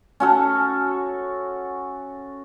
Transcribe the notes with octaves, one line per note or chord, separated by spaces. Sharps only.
C#4 F#4 A4